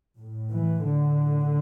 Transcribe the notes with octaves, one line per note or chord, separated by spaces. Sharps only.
A2
E3
A2 D3